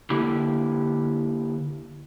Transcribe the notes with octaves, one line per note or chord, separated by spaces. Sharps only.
D3 A#3 E4 G4